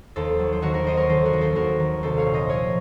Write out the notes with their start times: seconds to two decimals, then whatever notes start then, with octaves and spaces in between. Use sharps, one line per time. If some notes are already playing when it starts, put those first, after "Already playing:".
0.16 D#2 A4 C5
0.39 F#3
0.53 C5
0.62 D#3 F#4 A#4
0.74 F#4 A#4
0.84 D#2 C5 D#5
0.97 A#4 C#5
1.09 D#3 A4 C5
1.25 F#4 A#4
1.33 D#2
1.41 A4 C5
1.55 D#2 F#4 A#4
1.80 D#3
2.03 C2 A4 C5
2.18 C#5 F5
2.26 A#2
2.33 C5 D#5
2.49 F3 A#4 C#5